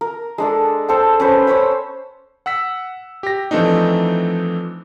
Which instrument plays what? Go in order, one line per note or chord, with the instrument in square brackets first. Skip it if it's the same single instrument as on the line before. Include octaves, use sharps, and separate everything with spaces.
[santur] A#4
G#3 D4 A4
A4 C5 G5
C#4 B4 C5
C#4 C5 C#5 B5
[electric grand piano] F#5 E6 B6
G4 A#6
E3 F3 A3 C4 D4 D#4